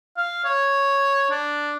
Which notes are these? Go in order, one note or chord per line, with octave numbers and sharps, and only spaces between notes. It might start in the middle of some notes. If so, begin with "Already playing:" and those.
F5
C#5
D4